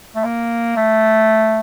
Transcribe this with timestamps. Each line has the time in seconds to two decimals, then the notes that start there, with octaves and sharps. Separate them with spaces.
0.15 A3
0.24 A#3
0.76 A3